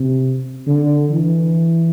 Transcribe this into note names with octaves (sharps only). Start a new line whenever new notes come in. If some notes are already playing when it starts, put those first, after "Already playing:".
Already playing: C3
D3
E3